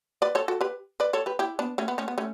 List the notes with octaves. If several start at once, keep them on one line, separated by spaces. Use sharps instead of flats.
B4 D5
A4 C#5
F#4 A4
G4 B4
B4 D5
A4 C#5
G4 B4
E4 G4
B3 D4
A3 C#4
B3
A3 C#4
B3
A3 C#4